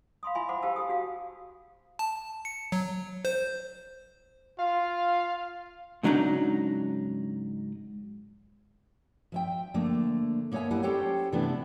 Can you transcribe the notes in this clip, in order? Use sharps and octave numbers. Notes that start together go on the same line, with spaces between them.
F5 B5 C6 D#6
E4 F4 E5 G#5 B5 C6
C5 F#5 B5 C6 D6
G4 C5 F5 A5 E6
G4 G#4 D#6
F#4 G4 F5
A5
C#7
F#3
C5
F4 F5
G#2 C#3 F#3 D4 D#4
F3 E5 G5
D3 F3 A3 A#3
A#3 B3 A4 C#5 E5 G#5
G3 A#3 E4 F#5 G#5
C#4 G4 A4 C5 C#5 G5
C3 E3 A3 B3 D4 E4